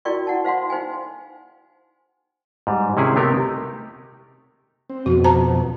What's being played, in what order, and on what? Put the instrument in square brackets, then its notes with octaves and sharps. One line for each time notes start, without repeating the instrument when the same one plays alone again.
[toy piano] E4 F#4 A#4 D5 G5 C#6
E4 F#5 A5
C5 F5 F#5 C6
D#4 C5 G5 G#5
[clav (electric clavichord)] G#2 G3
C3 D#3 C#4 E4 G#4
C3 A3 B3 D#4 G4 A#4
[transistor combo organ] C4
[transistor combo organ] F2 B2 [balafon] F#4
[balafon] C5 A5 A#5